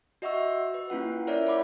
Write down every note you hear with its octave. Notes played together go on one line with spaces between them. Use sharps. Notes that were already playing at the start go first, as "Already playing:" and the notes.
F#4 D#5 E5 F#5 C#6 E6
B4
A#3 C#4 E4 F4 F#5
E4 A#4 C#5 D5 E5
C#5 F#5 B5 D6